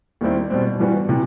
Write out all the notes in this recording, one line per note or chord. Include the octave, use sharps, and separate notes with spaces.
D#2 D#3 G3 C4 E4
B2 G3 C4
G2 E3 G3 B3 F#4
C3 E3